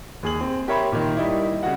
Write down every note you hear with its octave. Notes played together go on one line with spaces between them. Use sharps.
D#2 G#4 F#7
C4
G4 A#4 C#5 E5 B5 C6
A#2 D#3
G3 D#4 E4
C#3 G3 F#4 F#5